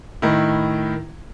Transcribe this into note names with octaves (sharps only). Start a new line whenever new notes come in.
A2 D#3 E4